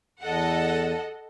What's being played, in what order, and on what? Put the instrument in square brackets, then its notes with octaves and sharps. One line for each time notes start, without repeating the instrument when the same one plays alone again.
[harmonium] E2 [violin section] A4 D#5 F#5